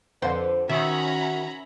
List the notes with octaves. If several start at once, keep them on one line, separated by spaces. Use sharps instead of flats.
F2 D3 B4 C5
D#3 C#4 F#4 E5 A#5 B5